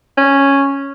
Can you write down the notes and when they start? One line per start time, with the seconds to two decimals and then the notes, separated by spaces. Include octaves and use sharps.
0.17 C#4